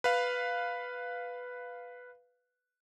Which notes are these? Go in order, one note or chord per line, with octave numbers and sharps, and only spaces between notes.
B4 F5